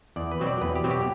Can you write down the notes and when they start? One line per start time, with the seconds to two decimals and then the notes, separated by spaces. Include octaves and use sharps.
0.16 E2 D5
0.32 B4
0.40 B2 F#3 C4
0.47 D5
0.61 E2 B4
0.75 G4
0.84 B2 F#3 C4
0.91 G4